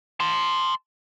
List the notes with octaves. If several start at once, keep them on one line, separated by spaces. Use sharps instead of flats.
A5 C6